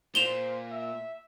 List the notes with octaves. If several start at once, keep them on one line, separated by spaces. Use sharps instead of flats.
A#2 C5 E7 F7 G7
E5